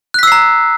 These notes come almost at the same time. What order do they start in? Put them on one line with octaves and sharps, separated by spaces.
F#6 B6 E6 C7 A#5